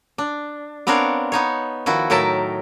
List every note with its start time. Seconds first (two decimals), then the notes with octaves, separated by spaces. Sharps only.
0.18 D4
0.87 B3 C4 D4 A#4 C#5 F5
1.32 B3 D#4 C#5
1.86 D#3 F3 E4 F#4
2.10 A2 D#3 F#3 A#4 E5 A5